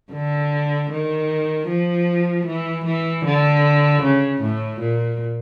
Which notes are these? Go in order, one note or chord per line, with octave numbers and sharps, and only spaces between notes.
D3
D#3
F3
E3
E3
D3
C#3
A2
A#2